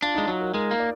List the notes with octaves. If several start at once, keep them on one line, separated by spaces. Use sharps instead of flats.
D4 F4
G#3 D#4
F#3 F4
A#4
G#3 A#4
A#3
D5